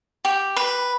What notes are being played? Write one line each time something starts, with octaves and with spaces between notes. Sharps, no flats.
G4
B4